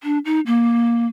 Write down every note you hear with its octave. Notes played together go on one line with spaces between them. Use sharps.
D4
D#4
A#3